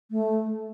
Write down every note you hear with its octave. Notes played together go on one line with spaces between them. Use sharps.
A3